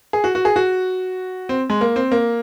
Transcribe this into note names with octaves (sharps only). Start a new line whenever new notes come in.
G#4
F#4
F#4
G#4
F#4
C4
G#3
A#3
C4
A#3